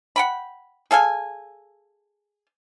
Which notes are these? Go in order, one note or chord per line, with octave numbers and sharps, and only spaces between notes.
F#5 G5 B5
G#4 A4 F5 G#5